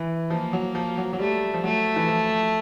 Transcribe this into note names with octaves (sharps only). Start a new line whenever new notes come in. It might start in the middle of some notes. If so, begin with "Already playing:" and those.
Already playing: E3
F3 A#3
F#3
F3
F#3
F#3
G3 A3
F3
F#3 A3
E3
F3